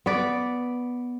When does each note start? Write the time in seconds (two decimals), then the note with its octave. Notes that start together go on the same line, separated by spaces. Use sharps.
0.06 B3 B4 D5